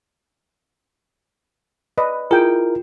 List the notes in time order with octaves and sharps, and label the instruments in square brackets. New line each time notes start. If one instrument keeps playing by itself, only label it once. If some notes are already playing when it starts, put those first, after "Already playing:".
[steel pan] B4 D5 D#5
[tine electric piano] E4 A#4 [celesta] F4 [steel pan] G#4 G5